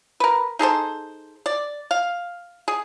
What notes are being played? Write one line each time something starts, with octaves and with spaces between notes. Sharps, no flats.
A#4 B4
D#4 G#4 A4 C5
D5
F5
G#4